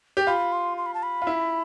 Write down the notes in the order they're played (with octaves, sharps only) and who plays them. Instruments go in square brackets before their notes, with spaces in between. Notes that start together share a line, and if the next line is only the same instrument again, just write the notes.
[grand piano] G4
[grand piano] F4 [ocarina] B5
[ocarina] C6
C6
B5
A5
B5
[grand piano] F4
E4